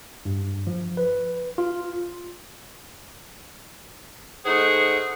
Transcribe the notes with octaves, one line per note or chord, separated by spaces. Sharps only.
G2
F3
B4
F4
A3 D#4 G#4 C5 F#5